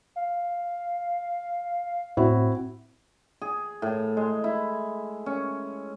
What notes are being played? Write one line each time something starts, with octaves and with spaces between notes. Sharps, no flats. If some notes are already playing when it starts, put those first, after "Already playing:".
F5
A2 C4 E4 F#4
G#4
A2
G#3
E4
C#4